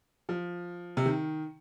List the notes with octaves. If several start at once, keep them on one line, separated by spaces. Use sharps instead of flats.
F3
C3
D#3